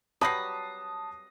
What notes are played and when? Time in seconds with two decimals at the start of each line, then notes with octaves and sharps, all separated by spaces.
0.21 F#3 G3 B4 A5 D#6 A#6 C7